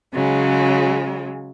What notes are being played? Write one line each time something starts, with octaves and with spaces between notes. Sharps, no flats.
C#3 F#3 G#3